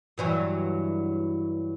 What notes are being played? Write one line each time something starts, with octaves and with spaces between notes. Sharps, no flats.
G2 E3 F#3